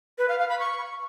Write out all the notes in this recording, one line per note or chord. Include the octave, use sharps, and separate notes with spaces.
B4
F5
F5
B5
C#6